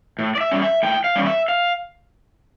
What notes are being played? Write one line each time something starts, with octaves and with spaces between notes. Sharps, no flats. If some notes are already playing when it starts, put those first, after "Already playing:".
A2
D5
E5
G3 C#4
E5
A2 G5
F5
G3 C#4
E5
F5